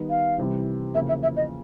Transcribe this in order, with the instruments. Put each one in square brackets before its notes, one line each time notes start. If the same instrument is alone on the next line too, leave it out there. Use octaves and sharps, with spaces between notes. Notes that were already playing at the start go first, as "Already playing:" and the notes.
Already playing: [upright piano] D#3 G3 B3 D#4
[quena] F5
[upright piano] C2 C3 E3 G3
[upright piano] E2 C#3 F3 A#3 [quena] E5
[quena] E5
E5
D#5